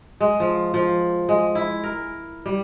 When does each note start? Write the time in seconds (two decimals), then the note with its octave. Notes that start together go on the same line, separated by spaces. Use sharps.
0.20 G#3
0.40 F3
0.74 F3
1.29 G#3
1.55 E4
1.83 A#4
2.46 G3